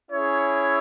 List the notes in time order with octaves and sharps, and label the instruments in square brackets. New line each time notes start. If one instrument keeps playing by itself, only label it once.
[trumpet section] C#4 E4 G#4 C#5 E5